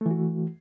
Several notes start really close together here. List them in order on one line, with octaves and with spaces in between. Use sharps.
A3 E3 F#4